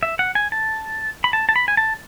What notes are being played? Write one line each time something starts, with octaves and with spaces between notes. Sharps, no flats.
E5
F#5
G#5
A5
B5
A5
A5
B5
G#5
A5